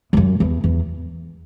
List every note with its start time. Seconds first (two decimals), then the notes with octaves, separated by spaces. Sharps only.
0.13 E2
0.17 F#2
0.40 E2
0.64 E2